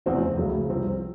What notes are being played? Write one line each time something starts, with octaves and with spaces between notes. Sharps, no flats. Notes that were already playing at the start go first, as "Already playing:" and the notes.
F1 E2 C#3 E3 C4
C#2 C#3 F#3 A3
C2 C3 F3 C4